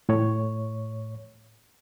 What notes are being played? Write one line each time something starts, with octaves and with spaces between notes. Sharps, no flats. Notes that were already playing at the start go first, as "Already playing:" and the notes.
A2 C#5